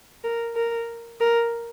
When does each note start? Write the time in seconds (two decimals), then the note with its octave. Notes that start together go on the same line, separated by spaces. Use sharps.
0.24 A#4
0.56 A#4
1.20 A#4